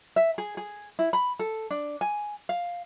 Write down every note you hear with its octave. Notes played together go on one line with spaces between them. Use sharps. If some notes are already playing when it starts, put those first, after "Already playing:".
E5
G#4
G#4
E4
B5
A4
D4
G#5
F5